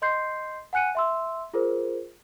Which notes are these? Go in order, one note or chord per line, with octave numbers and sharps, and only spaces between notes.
D#5 C6 G6 C7
F#5 G#5 F#6 C#7 D#7
E5 C6 E6
F4 G#4 A#4 C5